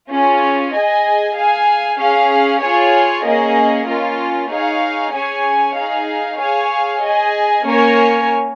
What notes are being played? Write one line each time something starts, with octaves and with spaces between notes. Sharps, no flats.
C#4 F4 G#4
G#4 D#5 G#5
G#4 F5 G#5
C#4 G#4 F5
F4 G#4 C#5 G#5
A#3 C#4 G#4 D#5
A#3 C#4 F4
D#4 G#4 C#5 F5
C#4 G#4 C#5 G#5
D#4 G#4 F5
G#4 C#5 F5 G#5
G#4 D#5 G#5
A#3 C#4 A#4 C#5 G#5